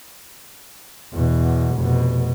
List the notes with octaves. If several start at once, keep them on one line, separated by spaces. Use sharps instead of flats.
E2 B2
F1 B2